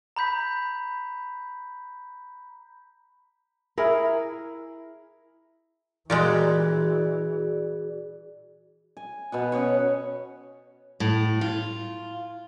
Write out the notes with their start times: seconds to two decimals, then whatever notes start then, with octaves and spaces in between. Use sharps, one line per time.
0.16 A#5 B5 G6 B6
3.78 E4 G#4 A#4
6.10 A#2 E3 G3 G#3 F#4 G#4 D5
8.97 G#5
9.32 B2 B4 F#5
9.52 C#4 G#4 C#5 F#5
11.00 A2
11.41 F4